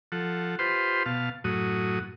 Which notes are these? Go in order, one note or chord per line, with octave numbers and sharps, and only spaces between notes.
F3 A4 F#5
F4 G4 B4 C5 C6
B2 F5 A5
F#2 A2 F#4 D#6